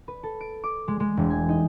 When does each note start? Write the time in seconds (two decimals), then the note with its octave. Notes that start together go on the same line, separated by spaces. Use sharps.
0.08 B4
0.23 A4
0.41 D7
0.64 D6
0.88 G#3
1.00 G#3
1.17 E1
1.30 G#5
1.49 D#4